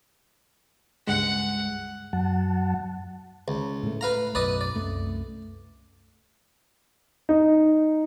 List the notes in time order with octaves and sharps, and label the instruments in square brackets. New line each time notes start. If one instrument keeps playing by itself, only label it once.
[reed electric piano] C#2 G2 G#3 [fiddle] F#5
[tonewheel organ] F#2 F#3 F#5 A5
[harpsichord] C#2
[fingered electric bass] A2 A3
[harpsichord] B4 F5 A#5
[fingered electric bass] B1 F#2 [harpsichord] B4 D5 D#5
[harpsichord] D5
[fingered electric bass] C2 F#2 A3
[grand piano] D#4